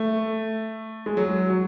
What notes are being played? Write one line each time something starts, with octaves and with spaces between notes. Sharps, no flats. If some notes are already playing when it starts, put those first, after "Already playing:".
Already playing: A3
G#3
F#3
F#3